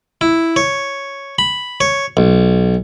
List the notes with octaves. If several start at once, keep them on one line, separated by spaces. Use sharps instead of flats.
E4
C#5
B5
C#5
B1